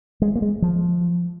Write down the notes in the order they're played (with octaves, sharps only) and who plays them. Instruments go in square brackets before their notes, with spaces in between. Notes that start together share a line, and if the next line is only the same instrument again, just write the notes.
[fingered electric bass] G#3
A#3
G#3
F3